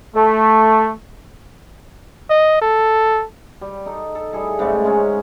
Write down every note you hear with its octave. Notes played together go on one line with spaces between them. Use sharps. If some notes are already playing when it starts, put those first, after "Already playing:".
A3
D#5
A4
G3
D#4 A4
A4
G3 E4 G#4 A4
G#2 C#3 G3 A3
G#3 C#4 D#4